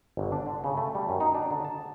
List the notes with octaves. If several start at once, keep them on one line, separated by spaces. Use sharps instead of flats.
G1
D4
D3
C#3
A3
G3
F#2
D#4
D4
D3
A5